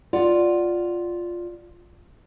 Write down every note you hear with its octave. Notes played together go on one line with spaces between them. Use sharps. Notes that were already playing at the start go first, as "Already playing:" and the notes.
F4 D5 F#5